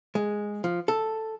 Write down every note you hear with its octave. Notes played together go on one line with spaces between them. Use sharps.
G#3
F3
A4